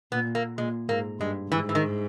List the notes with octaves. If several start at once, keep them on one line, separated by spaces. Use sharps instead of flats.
A#2 B3
A#3
A#2 G#3
G#2 A#3
G2 G#3
G#2 E3
E3
D#3